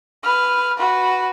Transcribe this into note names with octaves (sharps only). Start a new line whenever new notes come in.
B4 F6
F#4 B4